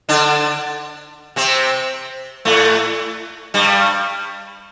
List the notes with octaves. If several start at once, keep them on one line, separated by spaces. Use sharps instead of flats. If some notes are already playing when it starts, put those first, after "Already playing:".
D3 D4
C3 C4
A2 A3
G2 G3